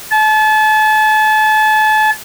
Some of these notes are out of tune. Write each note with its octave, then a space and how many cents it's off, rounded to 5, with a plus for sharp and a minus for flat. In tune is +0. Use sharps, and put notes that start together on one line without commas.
A5 -35